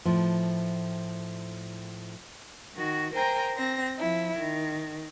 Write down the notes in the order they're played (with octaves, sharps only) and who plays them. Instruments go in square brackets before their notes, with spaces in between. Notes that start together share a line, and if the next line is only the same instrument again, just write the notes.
[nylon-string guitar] A2 F3
[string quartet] D#3 F#4
A#4 C5 G5 G#5 A#5
C4 A#6
F3 E4
D#3